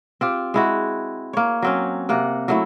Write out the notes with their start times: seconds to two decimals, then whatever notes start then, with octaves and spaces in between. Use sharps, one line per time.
0.21 C4 F4 G4
0.54 G#3 E4 F#4
1.33 A#3 C#5
1.62 F#3 C4 C#4
2.09 C3 A#3 F#5
2.48 F#3 A3 E4